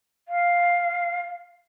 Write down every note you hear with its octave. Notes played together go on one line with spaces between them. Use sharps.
F5